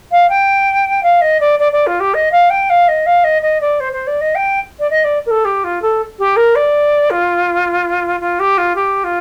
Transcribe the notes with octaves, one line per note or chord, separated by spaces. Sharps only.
F5
G5
F5
D#5
D5
D5
D5
F4
G4
D#5
F5
G5
F5
D#5
F5
D#5
D#5
D5
C5
C5
D5
D#5
G5
D5
D#5
D5
A#4
A4
G4
F4
A4
G4
A#4
D5
F4
F4
G4
F4
G4
F4